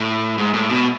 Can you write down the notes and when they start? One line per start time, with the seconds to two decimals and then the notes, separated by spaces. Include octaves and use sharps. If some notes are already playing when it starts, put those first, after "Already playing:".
Already playing: A2
0.38 G#2
0.54 A2
0.70 B2